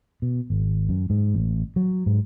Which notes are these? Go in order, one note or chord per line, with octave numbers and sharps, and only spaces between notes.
B2
G#1
F#2
G#2
A1
F#3
G#2